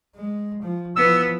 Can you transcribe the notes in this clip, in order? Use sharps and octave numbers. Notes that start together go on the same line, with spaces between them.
G#3
F3
E3 F3 B3 E6